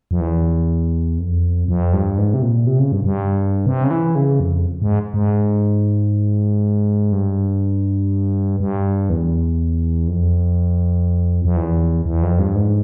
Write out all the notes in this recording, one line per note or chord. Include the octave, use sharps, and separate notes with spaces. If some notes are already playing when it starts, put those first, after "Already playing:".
F2
E2
F2
F2
G2
G#2
C3
A#2
C3
C#3
G2
G2
C3
C#3
E3
C#3
F2
G#2
G#2
G2
G2
E2
F2
F2
E2
E2
F2
G2
G#2